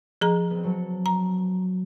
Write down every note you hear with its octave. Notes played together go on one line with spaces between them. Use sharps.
F3 G#4 A#5
B3 C4
F#3 A4 C#5
A#5